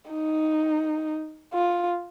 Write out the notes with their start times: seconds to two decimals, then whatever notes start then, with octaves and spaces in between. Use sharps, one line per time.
0.11 D#4
1.53 F4